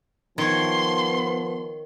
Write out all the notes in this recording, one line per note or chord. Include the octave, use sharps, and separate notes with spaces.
D#3 F3 B3 C#5 C6